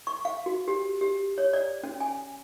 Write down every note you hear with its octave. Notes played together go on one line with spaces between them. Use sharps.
C#6
F5
F#4
G4
G4
C#5
D5
C#4
G#5